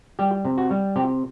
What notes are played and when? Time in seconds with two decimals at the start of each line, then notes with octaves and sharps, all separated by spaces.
0.19 G3 G4
0.45 C3
0.58 F#4
0.71 G3
0.96 C3 G4